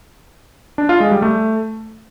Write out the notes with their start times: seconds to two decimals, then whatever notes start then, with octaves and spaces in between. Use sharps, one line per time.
0.78 D4
0.89 F4
1.00 G#3
1.11 G3
1.22 A3